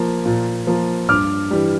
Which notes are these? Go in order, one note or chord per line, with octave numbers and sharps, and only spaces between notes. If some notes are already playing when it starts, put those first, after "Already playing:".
Already playing: F3 A#3
A#2
F3 A#3
G2 D6 F6
E3 G3